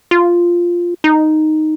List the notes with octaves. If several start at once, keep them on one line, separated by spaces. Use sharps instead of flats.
F4
D#4